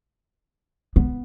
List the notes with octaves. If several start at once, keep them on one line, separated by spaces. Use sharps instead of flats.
B3